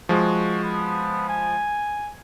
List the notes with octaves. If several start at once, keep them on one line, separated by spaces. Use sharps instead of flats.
F3 G#3 F#4
B3
G#5